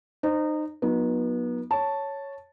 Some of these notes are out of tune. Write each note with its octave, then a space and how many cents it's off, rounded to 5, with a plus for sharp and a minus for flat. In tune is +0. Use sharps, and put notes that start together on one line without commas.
D#4 -25 C5 +0
F#3 -40 B3 -30 D#4 +0
C#5 +0 A5 +0